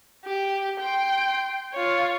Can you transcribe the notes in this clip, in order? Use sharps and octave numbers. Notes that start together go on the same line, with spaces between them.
G4
G5 C6
F4 C#5